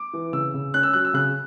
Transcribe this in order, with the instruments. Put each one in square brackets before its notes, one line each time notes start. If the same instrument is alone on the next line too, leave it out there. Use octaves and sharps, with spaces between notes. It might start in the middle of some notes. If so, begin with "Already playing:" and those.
Already playing: [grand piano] D6
E3
C#3 E6
C#3
C#4 F#6
E6
F#3 F#6
E6
C#3 F#6